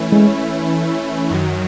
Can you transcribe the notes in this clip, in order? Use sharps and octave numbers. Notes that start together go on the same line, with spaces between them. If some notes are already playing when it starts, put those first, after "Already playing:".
Already playing: E3 A3 C#4 E4
G#3
F#2 D#3 F#3